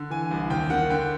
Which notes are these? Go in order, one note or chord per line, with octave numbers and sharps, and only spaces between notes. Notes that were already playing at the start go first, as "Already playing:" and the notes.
Already playing: D3
E3 G#5
C2
D#2 G5
D#3 F#5
D3 G5